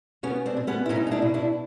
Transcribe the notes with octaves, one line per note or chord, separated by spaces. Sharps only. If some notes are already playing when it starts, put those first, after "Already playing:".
B2 B3 C#4
C4 D4
B2
B3 C#4
E4
B2 C#4 D#4
D#4
D4 E4
B2
D4 E4